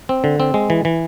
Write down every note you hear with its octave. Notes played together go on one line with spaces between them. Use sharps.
C4
D3
C4
G#3
E3
E3